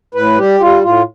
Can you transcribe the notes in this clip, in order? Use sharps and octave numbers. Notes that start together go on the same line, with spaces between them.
A2 B4
G3 G4
G3 F4
A2 F4